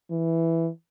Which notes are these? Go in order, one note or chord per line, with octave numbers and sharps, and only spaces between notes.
E3